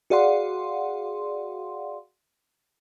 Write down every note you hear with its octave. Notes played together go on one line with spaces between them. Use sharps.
F#4 G#4 D5 F5 F#5 C6